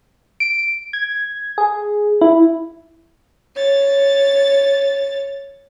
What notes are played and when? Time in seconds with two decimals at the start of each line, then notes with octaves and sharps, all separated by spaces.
0.40 D7
0.93 G#6
1.58 G#4
2.21 E4
3.55 C#5 A6